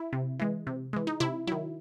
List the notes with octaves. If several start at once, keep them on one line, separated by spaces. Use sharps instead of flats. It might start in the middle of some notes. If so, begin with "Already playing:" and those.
Already playing: E4
C3
E3 G#3
C3
E3 G#3
D#4
C3 E4
D#3 F#3 E4